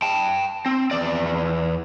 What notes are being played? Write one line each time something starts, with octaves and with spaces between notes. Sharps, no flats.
G5 A5
C4
E2 D5